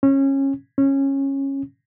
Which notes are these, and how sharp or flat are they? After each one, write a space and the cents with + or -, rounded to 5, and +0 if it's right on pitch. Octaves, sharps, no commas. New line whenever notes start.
C#4 -20
C#4 -15